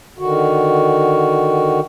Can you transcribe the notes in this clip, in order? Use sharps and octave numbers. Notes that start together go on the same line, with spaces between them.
D3 D#3 F#4